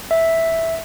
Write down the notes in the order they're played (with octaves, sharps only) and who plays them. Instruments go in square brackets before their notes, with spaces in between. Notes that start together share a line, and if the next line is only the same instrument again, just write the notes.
[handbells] E5